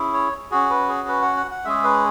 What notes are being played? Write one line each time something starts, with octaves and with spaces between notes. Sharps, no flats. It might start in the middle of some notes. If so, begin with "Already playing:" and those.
Already playing: C#4 E4 G#4
C#5
C#4 F#4 G#4
B4
G#4
B4
F#5
F#5
F#5
G#3 C#4 G#4 E5
B4